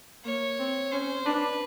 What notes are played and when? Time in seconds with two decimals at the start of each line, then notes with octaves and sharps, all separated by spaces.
0.24 A#3 C#5
0.59 C4
0.92 C#4 C5
1.26 D4 B4